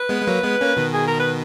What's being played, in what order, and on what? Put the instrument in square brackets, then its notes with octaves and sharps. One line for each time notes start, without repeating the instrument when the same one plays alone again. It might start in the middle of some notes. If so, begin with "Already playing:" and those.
Already playing: [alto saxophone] B4
[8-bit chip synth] G#3 B3
G#3
F#3 A#3
G#3 B3
A#3 C#4
B2 D#3
[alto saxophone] G#4
A#4
B4